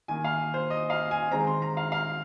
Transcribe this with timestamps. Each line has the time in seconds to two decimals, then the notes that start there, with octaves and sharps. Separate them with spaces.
0.08 D#3 A#3 G#5
0.24 F5
0.54 C5
0.70 D#5
0.90 F5
1.11 G#5
1.31 D#3 G#3 C4 A#5
1.47 C6
1.62 A#5
1.77 F5
1.92 F5